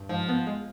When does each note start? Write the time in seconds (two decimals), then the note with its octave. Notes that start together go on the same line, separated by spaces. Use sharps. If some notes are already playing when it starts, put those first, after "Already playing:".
Already playing: G2
0.09 G#2 F3
0.28 B3
0.47 G#3